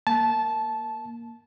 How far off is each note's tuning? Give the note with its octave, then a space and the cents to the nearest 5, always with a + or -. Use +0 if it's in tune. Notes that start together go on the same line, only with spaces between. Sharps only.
A#3 +0 A5 -15